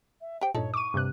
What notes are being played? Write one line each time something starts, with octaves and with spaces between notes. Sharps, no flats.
E5
G4 C5 G5
G2 A#2 D#4 E4 A4 C#5
C#6 D6 E6 D#7
G2 C3 F#6